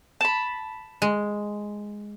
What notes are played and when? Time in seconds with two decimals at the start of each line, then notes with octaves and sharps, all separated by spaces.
0.21 A5 B5
1.02 G#3